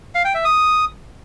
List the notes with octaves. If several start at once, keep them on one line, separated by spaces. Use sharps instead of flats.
F5
G5
E5
D#6